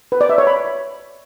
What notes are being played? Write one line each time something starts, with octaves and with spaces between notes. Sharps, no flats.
B4
D5
E5
C#5
B5